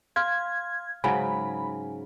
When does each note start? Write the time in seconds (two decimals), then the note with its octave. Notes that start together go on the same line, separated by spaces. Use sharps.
0.16 F5 C6 F6 G#6
1.04 G#2 C#3 F#3 G#5 B5